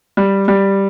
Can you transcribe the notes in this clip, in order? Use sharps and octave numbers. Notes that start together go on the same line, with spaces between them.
G3
G3